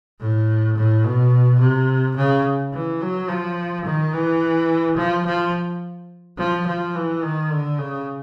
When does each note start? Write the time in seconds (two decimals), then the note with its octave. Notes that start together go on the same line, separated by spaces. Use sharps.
0.20 A2
0.77 A2
1.04 B2
1.60 C3
2.16 C#3
2.73 E3
3.01 F#3
3.28 F3
3.85 D#3
4.13 E3
4.97 F3
5.26 F3
6.38 F3
6.66 F3
6.95 E3
7.22 D#3
7.51 D3
7.79 C#3